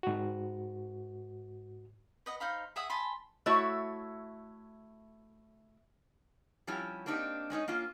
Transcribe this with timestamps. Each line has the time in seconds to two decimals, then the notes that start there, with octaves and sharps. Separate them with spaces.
0.03 G#2 F#4
2.26 B4 D#5 F#5
2.40 D#4 C5 F5 B5
2.76 G#4 E5 F#5 D#6
2.90 G#5 A5 B5 C6
3.46 A3 E4 F#4 C#5 E5
6.67 F3 G3 C#4 E4 G4
7.06 A#3 C4 D4 D#4 F4 G4
7.50 G#3 C#4 D#4 D#5
7.68 A#3 C#4 F4